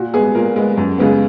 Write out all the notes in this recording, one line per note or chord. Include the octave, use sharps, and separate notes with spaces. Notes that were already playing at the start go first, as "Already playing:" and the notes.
Already playing: A#2 F#4
G#3 B3 G#4
A#2 A#4
G#3 B3
F#2
C#3 G#3 B3